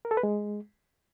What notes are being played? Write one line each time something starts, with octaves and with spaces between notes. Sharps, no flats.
A#4
A4
B4
G#3